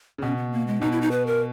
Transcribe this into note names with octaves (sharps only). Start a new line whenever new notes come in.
C#3
B2 C#4
B3
A#3
G#3
B2 D#4
E4
D#4
B4
A#4